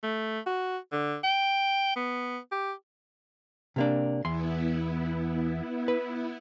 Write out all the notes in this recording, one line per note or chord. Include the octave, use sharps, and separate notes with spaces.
A3
F#4
D3
G5
B3
G4
C3 A#3 D4
E2 B3 E4 C6
B4